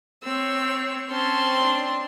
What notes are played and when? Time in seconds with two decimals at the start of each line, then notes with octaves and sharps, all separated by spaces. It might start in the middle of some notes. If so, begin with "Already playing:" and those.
0.24 C4 C#5 E6
1.10 C4 C#4 A5 C6
1.61 D4